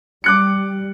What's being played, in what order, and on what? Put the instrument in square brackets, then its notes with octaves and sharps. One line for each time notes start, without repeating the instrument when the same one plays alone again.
[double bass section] G3 [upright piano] D6 F#6 C#7